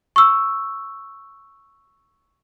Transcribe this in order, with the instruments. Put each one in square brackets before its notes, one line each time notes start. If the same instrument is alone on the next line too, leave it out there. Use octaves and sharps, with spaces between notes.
[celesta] C#6 E6